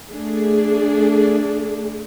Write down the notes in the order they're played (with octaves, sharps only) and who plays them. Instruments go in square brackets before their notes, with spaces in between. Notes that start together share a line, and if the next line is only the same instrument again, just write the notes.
[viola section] A3 D4 G#4